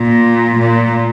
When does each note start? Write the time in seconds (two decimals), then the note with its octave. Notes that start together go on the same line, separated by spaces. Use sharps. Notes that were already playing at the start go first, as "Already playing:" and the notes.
Already playing: A#2
0.59 A#2